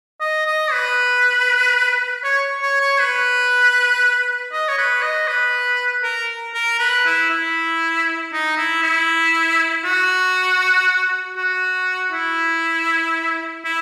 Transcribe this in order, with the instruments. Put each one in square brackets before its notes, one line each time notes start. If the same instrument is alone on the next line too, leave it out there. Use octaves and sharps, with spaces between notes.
[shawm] D#5
D#5
B4
C#5
C#5
C#5
B4
D#5
C#5
B4
D#5
B4
A#4
A#4
B4
E4
E4
D#4
E4
E4
F#4
F#4
E4
E4